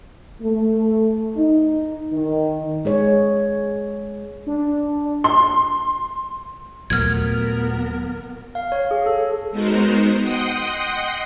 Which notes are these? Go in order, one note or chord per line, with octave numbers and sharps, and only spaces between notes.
A3
D#4
D#3
G#3 G#4 C#5
D4
C6
D#2 A#2 F#3 A3 B3 A#4 F6 G#6
F5
C#5
G#4
A4
G#3 B3 D#4 F#4 A#4 C5
D#5 F#5 G5 C6 D#6